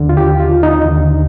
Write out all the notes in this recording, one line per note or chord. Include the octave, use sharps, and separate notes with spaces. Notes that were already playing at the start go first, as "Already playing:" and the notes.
Already playing: D#2 D3
F4
G4
F4
D#4
D#2 D3